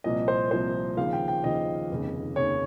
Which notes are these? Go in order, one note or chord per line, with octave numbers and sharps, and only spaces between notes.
C2 A#2 F3 D#5
C5
C2 A#2 F3 C5
D#2 C#3 F3 F5
G5
G5
D#2 C#3 F3 D#5
F1 D#2 C#3
F1 D#2 C#3 C#5